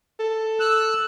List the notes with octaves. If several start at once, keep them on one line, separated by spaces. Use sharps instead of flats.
A4
E6 F#6